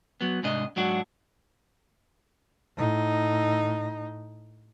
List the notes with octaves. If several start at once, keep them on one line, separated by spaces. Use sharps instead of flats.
F#3 B3
G#2 C3 D4 D#5
G#2 F#3 D4 F#4
A2 D#4